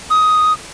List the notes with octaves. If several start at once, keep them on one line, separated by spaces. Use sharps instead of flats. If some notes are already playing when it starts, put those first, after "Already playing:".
D#6